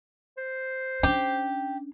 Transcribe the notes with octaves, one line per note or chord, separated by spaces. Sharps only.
C5
C#4 D4 G4